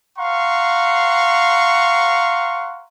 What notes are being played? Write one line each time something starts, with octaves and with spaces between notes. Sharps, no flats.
F5 F#5 A#5 C6 C#6